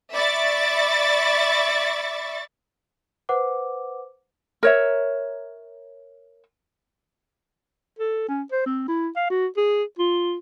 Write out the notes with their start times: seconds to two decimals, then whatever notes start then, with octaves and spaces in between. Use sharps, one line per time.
0.12 D5 E5 B5 C#6 D6 A6
3.29 B4 C5 F#5 D6
4.63 A#4 C#5 E5
7.99 A4
8.28 C#4
8.52 C5
8.66 C4
8.88 E4
9.16 F5
9.30 F#4
9.57 G#4
9.99 F4